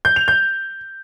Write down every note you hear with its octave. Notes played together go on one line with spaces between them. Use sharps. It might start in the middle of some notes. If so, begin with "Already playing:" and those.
G6
F7
G6